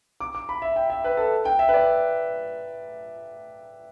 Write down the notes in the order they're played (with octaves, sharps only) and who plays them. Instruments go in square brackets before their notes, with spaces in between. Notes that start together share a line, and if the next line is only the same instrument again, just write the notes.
[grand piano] D6
D6
B5
E5
G5
E5
B4
A4
G5
E5
B4
D5